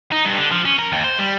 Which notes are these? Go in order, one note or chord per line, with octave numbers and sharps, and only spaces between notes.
D#4
G2
D3
F3
C#4
A#4
D#2
C5
G3